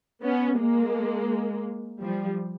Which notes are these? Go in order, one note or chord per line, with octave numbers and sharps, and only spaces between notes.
B3 C#4
G#3 A#3
F3 G3